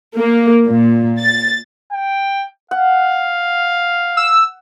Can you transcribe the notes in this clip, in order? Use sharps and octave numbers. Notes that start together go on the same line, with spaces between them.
A#3
A#2
A6
G5
F5 F#5
E6